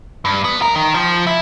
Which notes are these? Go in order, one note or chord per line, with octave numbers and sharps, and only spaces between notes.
G2
B3
A#4
D#3
F3
E4